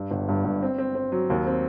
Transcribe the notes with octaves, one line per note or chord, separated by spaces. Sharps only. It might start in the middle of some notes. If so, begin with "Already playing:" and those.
Already playing: G2
G1
G2
G2
C4
C4
C4
F#3
D#2
C4